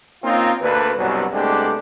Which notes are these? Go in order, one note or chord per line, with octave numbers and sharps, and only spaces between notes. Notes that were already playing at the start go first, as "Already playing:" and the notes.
A#3 C4 C#4 D#4 F4
D2 A#3 D4 B4
C2 G2 B2 F#3
C2 G#3 A3 B3 D4 G4